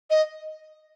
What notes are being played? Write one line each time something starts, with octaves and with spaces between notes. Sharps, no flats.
D#5